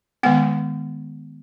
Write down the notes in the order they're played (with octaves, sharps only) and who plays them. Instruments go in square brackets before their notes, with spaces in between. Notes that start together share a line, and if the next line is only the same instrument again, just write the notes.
[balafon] D#3 G#3 B3 F#5